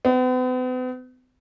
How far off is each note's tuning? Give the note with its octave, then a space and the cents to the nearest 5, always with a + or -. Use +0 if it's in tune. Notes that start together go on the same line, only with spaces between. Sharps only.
B3 +45